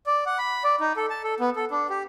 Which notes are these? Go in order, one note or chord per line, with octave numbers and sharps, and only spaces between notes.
D5
F#5
B5
D5
D#4
A4
A5
A4
B3
A4
D4
G4